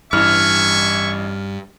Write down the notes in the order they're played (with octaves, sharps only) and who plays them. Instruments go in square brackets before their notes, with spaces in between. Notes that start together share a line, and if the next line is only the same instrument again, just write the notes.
[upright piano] A1 E3 [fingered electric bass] G2 [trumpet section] E5 G#5 C#6 [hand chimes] F6